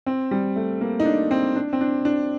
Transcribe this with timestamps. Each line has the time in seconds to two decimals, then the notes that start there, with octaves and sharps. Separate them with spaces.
0.06 C4
0.31 G3
0.56 A3
0.81 A#3
1.00 D#4
1.05 D4
1.31 C4
1.56 D4
1.73 C4
1.81 D4
2.05 D4